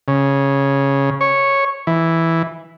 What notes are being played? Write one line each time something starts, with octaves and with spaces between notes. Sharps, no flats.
C#3
C#5
E3